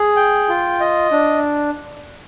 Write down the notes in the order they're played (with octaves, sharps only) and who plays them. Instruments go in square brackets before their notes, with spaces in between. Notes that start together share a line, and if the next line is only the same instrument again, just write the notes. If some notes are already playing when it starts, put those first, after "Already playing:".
Already playing: [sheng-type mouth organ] G#4
G5
F4
D#5
D4